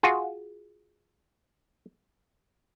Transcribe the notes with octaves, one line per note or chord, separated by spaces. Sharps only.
F4 F#4 G#4